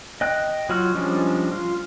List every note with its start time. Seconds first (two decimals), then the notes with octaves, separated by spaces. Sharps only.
0.21 D#5 G5 F#6
0.69 F#3 F4 F#4 F6
0.94 F3 G3 G#3 C#4 D4
1.52 F4